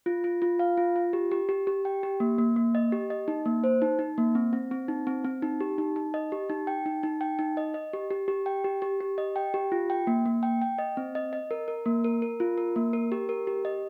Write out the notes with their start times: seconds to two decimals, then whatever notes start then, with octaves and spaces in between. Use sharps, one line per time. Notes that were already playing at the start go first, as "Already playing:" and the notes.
0.06 F4
0.24 F4
0.42 F4
0.59 F5
0.77 F4
0.96 F4
1.13 G4
1.32 G4
1.49 G4
1.67 G4
1.85 G5
2.03 G4
2.20 A#3
2.38 A#3
2.56 A#3
2.75 D#5
2.92 G4
3.10 D#5
3.28 D#4
3.46 A#3
3.64 C5
3.82 D#4
3.99 D#4
4.18 A#3
4.35 C4
4.53 C4
4.71 C4
4.88 D#4
5.07 C4
5.24 C4
5.42 D#4
5.60 G4
5.78 D#4
5.96 D#4
6.14 D#5
6.32 G4
6.50 D#4
6.67 G5
6.86 D#4
7.03 D#4
7.21 G5
7.39 D#4
7.57 D#5
7.74 D#5
7.93 G4
8.11 G4
8.28 G4
8.46 G5
8.64 G4
8.82 G4
9.00 G4
9.18 D#5
9.36 G5
9.54 G4
9.72 F4
9.90 G5
10.07 A#3
10.26 A#3
10.43 G5
10.62 G5
10.78 D#5
10.97 C4
11.15 D#5
11.33 D#5
11.51 A#4
11.68 A#4
11.86 A#3
12.04 A#4
12.22 A#4
12.40 F4
12.58 A#4
12.76 A#3
12.93 A#4
13.12 G4
13.29 A#4
13.47 G4
13.65 D#5